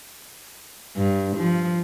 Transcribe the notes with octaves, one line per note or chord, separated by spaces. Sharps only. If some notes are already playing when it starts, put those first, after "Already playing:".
G2
F3